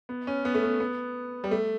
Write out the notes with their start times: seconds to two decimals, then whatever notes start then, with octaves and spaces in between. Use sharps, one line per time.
0.09 B3
0.27 C#4
0.45 B3
0.55 A3
0.64 B3
0.80 B3
1.44 G3
1.51 A3